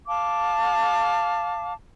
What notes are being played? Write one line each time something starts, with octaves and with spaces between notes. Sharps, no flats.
F5 A5 D6